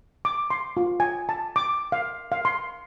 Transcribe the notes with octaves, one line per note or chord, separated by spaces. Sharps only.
D6
C6
F4
G#5
A5
D6
F5
F5
C6